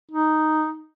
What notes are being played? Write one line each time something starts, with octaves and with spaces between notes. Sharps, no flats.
D#4